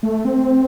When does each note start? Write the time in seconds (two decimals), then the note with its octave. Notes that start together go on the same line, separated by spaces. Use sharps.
0.03 A3
0.25 C4